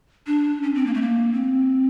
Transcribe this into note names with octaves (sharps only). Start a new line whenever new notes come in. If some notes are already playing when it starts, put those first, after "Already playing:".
D4
C#4
C4
A#3
A3
A#3
C4